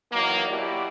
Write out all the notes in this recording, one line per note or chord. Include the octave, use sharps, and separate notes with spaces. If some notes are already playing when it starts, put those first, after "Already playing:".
D#3 E3 F#3 A#3
B2 F#3 E4 F#4 G4 D5